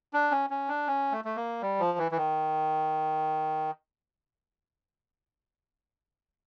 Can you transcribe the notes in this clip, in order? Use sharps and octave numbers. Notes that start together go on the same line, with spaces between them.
D4
C#4
C#4
D4
C#4
A3
A3
A#3
G3
F3
E3
E3
D#3